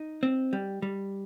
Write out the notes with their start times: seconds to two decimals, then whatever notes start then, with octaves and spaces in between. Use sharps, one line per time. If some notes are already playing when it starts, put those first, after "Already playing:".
Already playing: D#4
0.23 C4
0.53 G3
0.82 G3